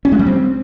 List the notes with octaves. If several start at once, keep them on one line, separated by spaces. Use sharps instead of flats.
C#4
G#3
G3
C4